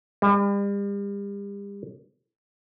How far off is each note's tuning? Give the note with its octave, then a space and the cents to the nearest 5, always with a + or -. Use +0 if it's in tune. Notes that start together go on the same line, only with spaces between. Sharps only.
G3 +40